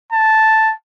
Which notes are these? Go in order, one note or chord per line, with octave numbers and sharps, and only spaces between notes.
A5